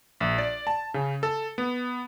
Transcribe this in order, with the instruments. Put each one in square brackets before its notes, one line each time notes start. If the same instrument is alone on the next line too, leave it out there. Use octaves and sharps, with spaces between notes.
[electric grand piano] A#1
D5
A5
C#3
A4
B3